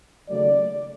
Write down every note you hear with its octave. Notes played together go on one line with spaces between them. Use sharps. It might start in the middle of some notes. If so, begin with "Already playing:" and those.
D#2 C#3 F#3 A3 D5